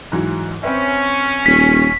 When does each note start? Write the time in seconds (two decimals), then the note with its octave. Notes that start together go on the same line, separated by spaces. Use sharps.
0.12 G#2 E3 F#3
0.63 C4 C#4 B4 E5
1.46 D#1 B6